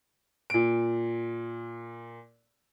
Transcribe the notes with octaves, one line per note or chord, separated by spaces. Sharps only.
A#2 D7